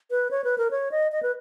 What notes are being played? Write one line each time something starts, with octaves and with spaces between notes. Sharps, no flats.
B4
C#5
B4
A#4
C#5
D#5
D#5
B4